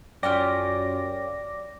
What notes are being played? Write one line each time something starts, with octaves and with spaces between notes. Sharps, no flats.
F#2 C#4 F4 G4 D5 D6 A#6